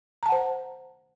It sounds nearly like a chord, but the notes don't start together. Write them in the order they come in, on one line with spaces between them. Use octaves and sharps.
A#5 A5 F#5 C5